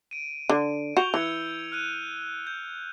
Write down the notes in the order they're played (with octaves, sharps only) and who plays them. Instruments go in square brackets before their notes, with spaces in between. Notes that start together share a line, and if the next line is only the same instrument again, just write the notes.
[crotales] D7 D#7
[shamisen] D3
[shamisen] F#4 [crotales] G6 F7 G7
[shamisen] E3 [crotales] E6 G#6 C#7
[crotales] F6 F#6 D#7
G6